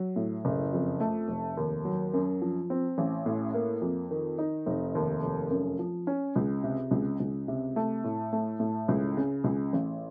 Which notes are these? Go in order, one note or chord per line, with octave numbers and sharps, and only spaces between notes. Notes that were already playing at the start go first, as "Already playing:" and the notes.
Already playing: F#3
A2
F#1
F2
A3
F1
D#2
F#3
F#2
F3
C4
A1
A2
A#3
F2
D#3
D#4
F1
D#2
F1
F#2
F3
C#4
C#2
C3
C#2
C#2
C3
A3
A2
A3
A2
C#2
C#3
C#2
A1